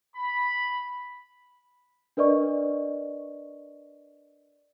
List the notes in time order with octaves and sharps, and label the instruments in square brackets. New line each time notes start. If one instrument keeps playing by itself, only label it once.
[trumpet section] B5
[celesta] D4 A#4 B4 D5 D#5 C#6